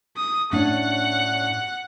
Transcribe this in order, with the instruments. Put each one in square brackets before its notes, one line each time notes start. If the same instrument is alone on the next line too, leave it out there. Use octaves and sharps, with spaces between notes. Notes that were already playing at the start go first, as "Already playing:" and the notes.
[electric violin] D#6
[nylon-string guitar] A2 C#4 D4 [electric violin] F#5